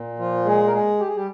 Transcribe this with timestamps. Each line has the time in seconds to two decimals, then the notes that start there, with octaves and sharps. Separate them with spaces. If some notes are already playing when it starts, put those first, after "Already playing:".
Already playing: A#2
0.19 F3 F4
0.45 G#3 G#4
0.67 A#4
0.73 G#3 G#4
1.00 G4
1.08 G#4
1.16 G3 G4